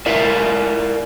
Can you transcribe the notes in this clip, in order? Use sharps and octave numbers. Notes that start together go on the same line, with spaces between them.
E4 A#4 D5 E5 F5